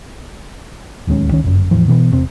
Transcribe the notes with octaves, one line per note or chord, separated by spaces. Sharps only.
D1 D#2 G#3 C#4
C#2 D#3 C#4
G1 F#2
E2 A2 E3 F3
B2 E3 F#3 B3
E1 C3 C4